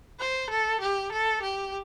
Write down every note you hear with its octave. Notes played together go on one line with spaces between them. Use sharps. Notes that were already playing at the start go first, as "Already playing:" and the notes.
C5
A4
G4
A4
G4